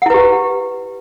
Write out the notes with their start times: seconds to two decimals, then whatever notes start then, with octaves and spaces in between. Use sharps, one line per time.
0.02 F#5
0.06 E4
0.10 B4
0.14 G4